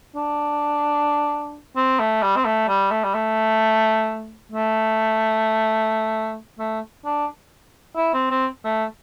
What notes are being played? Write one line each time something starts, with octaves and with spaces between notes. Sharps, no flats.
D4
C4
A3
G3
C4
A3
G3
A3
G3
A3
A3
A3
D4
E4
C4
C4
A3